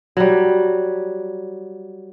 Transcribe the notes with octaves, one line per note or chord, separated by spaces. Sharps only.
F#3 G3